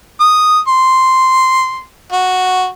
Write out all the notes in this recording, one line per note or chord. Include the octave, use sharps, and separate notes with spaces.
D#6
C6
F#4